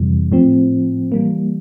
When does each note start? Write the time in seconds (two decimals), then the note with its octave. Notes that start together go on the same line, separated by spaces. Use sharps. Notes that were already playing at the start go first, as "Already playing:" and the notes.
Already playing: F2 C3 E3 G3
0.32 A2 F3 C4
1.12 E3 G3 A#3